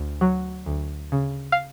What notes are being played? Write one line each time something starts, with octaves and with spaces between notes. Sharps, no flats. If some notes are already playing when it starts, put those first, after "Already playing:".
Already playing: D2
F#3
D2
C#3
F5